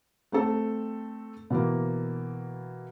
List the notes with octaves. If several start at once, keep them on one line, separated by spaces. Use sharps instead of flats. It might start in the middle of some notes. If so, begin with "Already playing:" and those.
A3 C4 A4
B2 E3 A#3